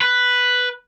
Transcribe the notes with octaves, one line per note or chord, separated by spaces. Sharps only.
B4